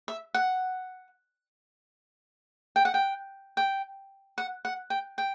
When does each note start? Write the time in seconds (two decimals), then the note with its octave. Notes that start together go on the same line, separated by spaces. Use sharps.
0.08 E5
0.34 F#5
2.76 G5
2.85 F#5
2.94 G5
3.57 G5
4.38 F#5
4.65 F#5
4.90 G5
5.18 G5